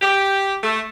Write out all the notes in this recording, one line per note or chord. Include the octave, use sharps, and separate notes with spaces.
G4
A3